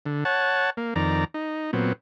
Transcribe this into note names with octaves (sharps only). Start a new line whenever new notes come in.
D3
C#5 F#5 A5
A#3
F2 D#3 D5 A#5
D#4
A#2 F#3 B3 C4